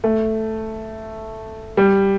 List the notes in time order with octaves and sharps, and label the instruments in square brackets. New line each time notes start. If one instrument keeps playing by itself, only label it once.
[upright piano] A3
G3